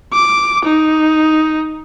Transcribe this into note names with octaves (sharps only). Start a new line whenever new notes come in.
D6
D#4